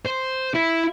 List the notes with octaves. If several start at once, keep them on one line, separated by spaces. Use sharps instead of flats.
C5
E4